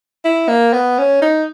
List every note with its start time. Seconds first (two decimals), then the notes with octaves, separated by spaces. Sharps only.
0.24 E4
0.49 A#3
0.73 B3
0.98 C#4
1.22 D#4